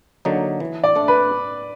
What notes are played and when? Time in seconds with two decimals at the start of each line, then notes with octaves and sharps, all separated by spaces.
0.25 D3 F#3 A#3 D#4
0.60 E3
0.84 D5
0.95 A3 D4
1.08 B4